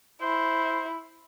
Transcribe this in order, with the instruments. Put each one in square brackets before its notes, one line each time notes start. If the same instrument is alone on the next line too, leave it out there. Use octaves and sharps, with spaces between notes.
[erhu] E4 [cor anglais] C5